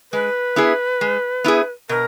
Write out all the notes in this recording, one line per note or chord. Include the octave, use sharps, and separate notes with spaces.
G#3 B4
B3 E4 G#4
G#3
B3 E4 G#4
B2 A#4